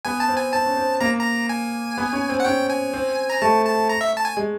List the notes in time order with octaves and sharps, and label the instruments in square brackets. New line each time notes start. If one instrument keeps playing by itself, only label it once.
[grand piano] B3 [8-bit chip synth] G#5
[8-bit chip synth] A5
[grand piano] C4
[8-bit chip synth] G#5
[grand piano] C4 [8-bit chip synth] A5
[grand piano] C#4
C4
[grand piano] A#3 [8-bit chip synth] A#5
[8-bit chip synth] A#5
G#5
[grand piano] B3
C#4
C4
[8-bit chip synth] F#5
[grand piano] C#4 [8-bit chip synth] G5
[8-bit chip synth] G#5
[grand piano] C4
[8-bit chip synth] A#5
[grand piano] A3 [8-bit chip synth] A5
[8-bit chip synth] A5
A#5
E5
A5
G#5
[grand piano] G#3